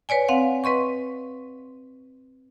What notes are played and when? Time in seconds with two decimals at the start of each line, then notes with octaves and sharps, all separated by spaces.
0.09 B4 C#5 D5 G#5
0.28 C4 F5 F#5
0.64 B4 D#5 C6 C#6